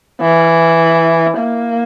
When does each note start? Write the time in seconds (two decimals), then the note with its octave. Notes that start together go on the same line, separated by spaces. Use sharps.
0.21 E3
1.38 A#3